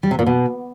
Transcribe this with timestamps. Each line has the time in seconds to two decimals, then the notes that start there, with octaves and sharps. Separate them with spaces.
0.03 G3
0.11 C3
0.19 A#2
0.26 B2